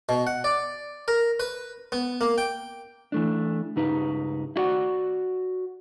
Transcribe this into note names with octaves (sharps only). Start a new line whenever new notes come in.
B2
F#5
D5
A#4
B4
B3
A#3
G5
E3 A3 D4
C#2 G2 D#4 B4
E4 F#4 D5 F#5